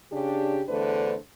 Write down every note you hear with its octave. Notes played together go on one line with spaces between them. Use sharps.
C#3 D4 G4
E2 D3 A3 D4 B4 C5